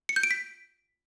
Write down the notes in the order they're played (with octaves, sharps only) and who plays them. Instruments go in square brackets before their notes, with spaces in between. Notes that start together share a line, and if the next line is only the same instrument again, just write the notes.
[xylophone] C#7
G6
D7
B6